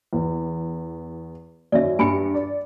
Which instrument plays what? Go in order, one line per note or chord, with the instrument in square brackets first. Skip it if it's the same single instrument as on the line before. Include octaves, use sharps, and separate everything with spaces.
[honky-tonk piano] E2
[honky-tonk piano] F#2 D#3 C#4 [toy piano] D5 E5
[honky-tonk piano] G2 C#7 [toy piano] G#5 B5
[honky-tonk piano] D5